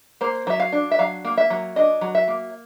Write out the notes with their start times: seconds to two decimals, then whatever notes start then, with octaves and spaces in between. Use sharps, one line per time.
0.21 A#3 C5
0.47 F#3 E5
0.60 F5
0.72 D4
0.91 E5
0.99 F#3 F5
1.25 A#3
1.38 E5
1.50 F#3
1.76 D4 D#5
2.01 F#3
2.15 E5
2.28 A#3